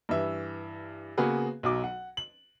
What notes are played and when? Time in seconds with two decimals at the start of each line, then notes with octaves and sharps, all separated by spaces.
0.09 G2 E3 E5
1.18 C#3 A#3 B3 F#4 G#4 B4
1.63 B1 F#3 D6
1.84 F#5
2.17 F#7